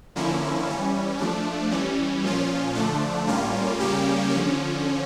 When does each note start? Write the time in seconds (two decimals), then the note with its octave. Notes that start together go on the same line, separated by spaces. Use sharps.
0.15 D3 F3 A#3 C#4 E4
0.67 E3 G3 C#4
1.19 F3 A3 D4
1.71 E3 G3 C#4
2.24 A#2 F3 C#4 F4
2.75 D3 F3 A3 D4
3.27 A2 G3 A#3 C#4 F4
3.80 C#3 G3 A#3 C#4 G4
4.31 D3 F3 C#4